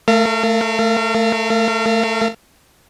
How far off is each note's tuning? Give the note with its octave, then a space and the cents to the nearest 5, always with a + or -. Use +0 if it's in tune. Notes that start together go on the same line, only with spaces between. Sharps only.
A3 +0 A#4 -35 F5 -35